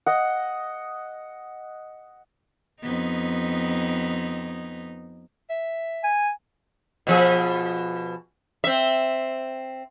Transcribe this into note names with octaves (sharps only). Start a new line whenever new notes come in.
D#5 F#5
F2 B3 D#4
E5
G#5
B2 F3 G#4
C4 E5